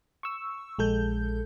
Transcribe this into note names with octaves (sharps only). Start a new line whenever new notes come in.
C#6 E6
A#1 G#3 A4 G6